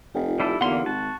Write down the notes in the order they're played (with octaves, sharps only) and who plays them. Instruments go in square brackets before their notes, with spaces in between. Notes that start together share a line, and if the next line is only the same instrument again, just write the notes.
[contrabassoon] F1 [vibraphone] D#4 F4 G4
[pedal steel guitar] G3 E4 A4
[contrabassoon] E2 [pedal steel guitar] D3 E3 A#3 [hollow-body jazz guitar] F#5 C6
[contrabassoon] G#1 [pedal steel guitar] F#4 A5